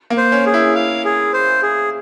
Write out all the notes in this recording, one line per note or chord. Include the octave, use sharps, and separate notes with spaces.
A#3
C5
C#4
G#4
E4
F5
G#4
C5
G#4